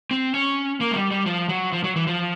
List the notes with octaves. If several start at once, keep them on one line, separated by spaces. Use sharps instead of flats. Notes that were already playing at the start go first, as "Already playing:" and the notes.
C4
C#4
A#3
G#3
G3
G3
F3
F#3
F3
F#3
E3
F3